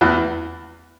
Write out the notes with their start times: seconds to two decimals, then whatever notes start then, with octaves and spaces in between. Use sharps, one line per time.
0.01 E2 E3